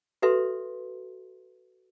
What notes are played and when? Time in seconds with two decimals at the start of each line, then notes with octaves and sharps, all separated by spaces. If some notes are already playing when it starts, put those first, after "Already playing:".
0.22 F#4 A4 B4 E5 C6